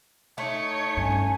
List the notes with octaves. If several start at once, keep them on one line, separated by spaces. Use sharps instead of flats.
A3 D#4 C#5
G2 C#4 G#5